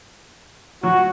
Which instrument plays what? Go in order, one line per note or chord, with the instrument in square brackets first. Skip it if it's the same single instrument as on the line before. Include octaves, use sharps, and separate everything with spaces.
[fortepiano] F#3 [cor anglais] F#4